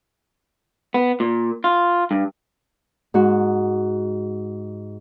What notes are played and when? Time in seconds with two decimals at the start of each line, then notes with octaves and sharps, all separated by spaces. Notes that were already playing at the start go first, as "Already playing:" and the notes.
0.94 B3
1.20 A#2
1.64 F4
2.11 G2
3.14 G#2 F#4